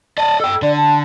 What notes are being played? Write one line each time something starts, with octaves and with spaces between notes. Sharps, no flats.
D5 D#5 A5
A4 G5 E6
D3 D5
A5